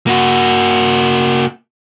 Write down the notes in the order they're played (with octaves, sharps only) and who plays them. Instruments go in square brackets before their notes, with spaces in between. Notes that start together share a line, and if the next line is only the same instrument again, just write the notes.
[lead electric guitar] A#3 F#4